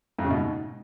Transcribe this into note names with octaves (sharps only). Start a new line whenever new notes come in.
F2
C#3
B2
G#2